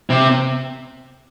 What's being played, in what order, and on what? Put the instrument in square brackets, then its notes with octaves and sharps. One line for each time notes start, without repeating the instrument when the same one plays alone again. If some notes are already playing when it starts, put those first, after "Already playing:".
[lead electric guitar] C3